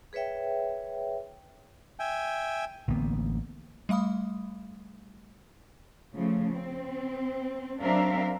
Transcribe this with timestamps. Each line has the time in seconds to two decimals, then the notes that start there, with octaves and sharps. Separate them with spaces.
0.13 G#4 B4 C#5 E5 G5
1.99 E5 G5 G#5
2.88 A1 D3 A#3 B3
3.89 G3 A3 F5 B5 D#6
6.14 C#3 F3 A3
6.52 C4
7.81 F#3 C4 D4 A#4 E5 F5